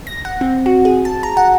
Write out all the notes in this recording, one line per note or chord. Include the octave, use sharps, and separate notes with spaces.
A#6
F#5
C4
F#4
G#4
A5
A#5
F#5